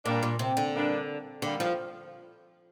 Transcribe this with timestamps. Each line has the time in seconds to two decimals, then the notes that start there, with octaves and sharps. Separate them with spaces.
0.05 A#2 G3 A#3 D4
0.23 A#2
0.39 C3
0.57 D3
0.74 G3 A#3 D4
1.42 D3 G3 A#3 D4
1.60 F3